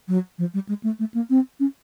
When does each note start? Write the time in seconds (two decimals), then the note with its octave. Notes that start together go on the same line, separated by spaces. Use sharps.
0.08 F#3
0.38 F3
0.54 G3
0.69 G#3
0.83 A3
0.99 A3
1.14 A#3
1.30 C4
1.60 C#4